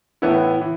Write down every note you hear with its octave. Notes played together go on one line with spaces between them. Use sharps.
A2 E3 B3 E4
E3